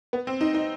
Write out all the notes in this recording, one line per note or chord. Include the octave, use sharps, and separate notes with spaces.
B3
C4
D#4
D#4